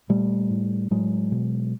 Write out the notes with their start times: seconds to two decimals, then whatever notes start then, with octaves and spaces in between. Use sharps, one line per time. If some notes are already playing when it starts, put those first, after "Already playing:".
0.09 A#2 G3 A3
0.50 A2
0.91 A2 F#3 G#3
1.32 B2